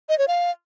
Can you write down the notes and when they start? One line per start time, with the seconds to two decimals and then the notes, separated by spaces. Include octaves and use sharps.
0.09 D#5
0.18 C#5
0.28 F5